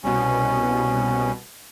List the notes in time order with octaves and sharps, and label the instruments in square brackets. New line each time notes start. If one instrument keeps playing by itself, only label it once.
[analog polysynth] C2 B2 [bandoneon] C#4